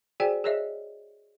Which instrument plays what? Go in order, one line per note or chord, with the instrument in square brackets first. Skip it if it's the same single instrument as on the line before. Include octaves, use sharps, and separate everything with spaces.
[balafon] F#4 G#4 C5 D5 G5 G#5
G#4 A#4 C#5 D#5 E5